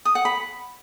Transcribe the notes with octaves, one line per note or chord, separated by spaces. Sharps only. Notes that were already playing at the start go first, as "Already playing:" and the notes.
D#6
F#5
B5